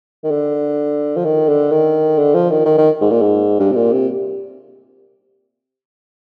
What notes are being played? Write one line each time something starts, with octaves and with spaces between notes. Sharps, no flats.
D#3
D3
F3
D#3
D3
D#3
D3
F3
D#3
D#3
D#3
G#2
A#2
G#2
G2
C3
A#2
C3